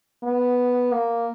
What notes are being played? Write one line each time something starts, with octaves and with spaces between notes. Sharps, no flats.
B3
A#3